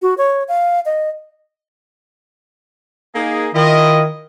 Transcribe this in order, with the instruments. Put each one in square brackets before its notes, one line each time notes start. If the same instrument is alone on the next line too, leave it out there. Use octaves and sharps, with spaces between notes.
[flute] F#4
C#5
F5
D#5
[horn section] A#3 D#4 G#4
[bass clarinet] D#3 [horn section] E4 F4 D#5